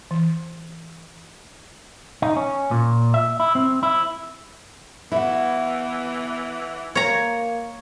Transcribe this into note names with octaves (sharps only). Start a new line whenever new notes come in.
E3
D#4
C#4
A#2
E5
E4
C4
E4
E3 B3 E4 F#4
A#3 C#5 A#5